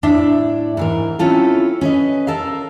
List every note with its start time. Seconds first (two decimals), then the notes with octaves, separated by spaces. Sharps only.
0.03 A2 D4 D5 E5
0.77 G#2 E3 A#4
1.19 C4 C#4 E4 F4 A4
1.81 C#4 B4 D#5
2.27 A4 A#4 F5